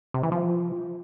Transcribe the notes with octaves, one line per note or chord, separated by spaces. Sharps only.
C3
E3
F3